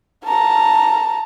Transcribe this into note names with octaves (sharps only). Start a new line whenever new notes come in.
A5 A#5